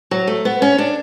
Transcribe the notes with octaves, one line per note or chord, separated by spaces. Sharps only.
F#3
A3
B3
C#4
D4